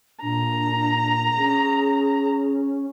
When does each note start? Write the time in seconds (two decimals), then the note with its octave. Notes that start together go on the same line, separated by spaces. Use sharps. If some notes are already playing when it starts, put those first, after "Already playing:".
0.22 A#2 D4 A#5
1.37 C#4 G#4